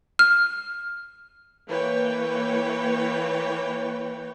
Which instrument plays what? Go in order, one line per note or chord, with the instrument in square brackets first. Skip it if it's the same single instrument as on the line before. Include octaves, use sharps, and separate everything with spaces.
[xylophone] F6
[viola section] E3 A#3 B4 C#5 G5